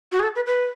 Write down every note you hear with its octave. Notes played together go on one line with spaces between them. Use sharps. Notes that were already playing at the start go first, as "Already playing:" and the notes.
F#4
G#4
A4
B4
B4